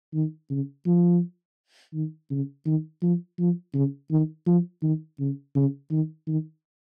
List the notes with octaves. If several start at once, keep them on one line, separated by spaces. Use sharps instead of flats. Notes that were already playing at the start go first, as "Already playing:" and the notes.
D#3
C#3
F3
D#3
C#3
D#3
F3
F3
C#3
D#3
F3
D#3
C#3
C#3
D#3
D#3